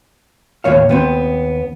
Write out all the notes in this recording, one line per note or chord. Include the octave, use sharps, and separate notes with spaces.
D#2 A2 A3 C#5 F5
D#2 B3 C4